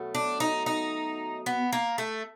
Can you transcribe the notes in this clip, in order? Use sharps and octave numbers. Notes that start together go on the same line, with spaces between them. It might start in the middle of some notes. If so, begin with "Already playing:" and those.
Already playing: B2 F#3 A3
D4
D#4
D#4
B3
A#3
A3